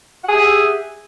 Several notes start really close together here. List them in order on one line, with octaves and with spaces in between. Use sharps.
F#5 G#4 G4 E5